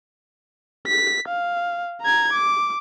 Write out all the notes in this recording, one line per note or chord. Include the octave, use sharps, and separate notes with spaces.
B6
F5
A#5 G#6
D6